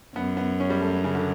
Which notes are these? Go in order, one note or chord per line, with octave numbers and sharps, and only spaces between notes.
F#2 B3
B3
C#4
G3
A3
C#3
D3